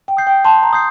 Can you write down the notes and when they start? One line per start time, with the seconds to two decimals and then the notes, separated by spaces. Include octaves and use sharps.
0.08 G5
0.17 D#6 G6 C7
0.27 G5
0.45 A5 C6
0.63 A#5
0.73 D#6 G6 C7